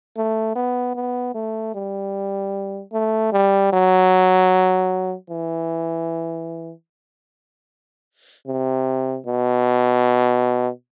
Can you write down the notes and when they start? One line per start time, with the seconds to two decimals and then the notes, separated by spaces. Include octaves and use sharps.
0.17 A3
0.56 B3
0.96 B3
1.35 A3
1.75 G3
2.93 A3
3.33 G3
3.73 F#3
5.30 E3
8.47 C3
9.27 B2